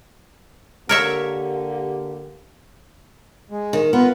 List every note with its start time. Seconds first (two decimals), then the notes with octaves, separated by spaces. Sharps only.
0.89 D3 A#3 G4 A#4 C#5 E5
3.50 G#3
3.73 D#3
3.93 B3 F4 A#4 B4